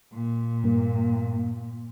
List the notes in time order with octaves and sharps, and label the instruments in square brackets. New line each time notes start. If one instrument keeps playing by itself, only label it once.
[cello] A#2
[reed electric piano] G2 A#3